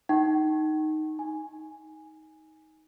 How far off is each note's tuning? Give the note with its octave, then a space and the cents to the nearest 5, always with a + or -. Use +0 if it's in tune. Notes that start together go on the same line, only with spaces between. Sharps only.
D#4 +0 G5 -40 C#6 -25
D#4 +20 G#5 +0